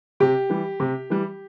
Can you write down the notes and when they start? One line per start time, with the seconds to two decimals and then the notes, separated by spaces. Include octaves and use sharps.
0.20 C3 G4
0.50 E3 G3
0.80 C3
1.10 E3 G3